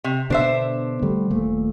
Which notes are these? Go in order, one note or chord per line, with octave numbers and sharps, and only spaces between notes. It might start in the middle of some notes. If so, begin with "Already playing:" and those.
C3
B2 D3 B3 D4 C5 E5
D3 G3 A3
D#1 A#2 A3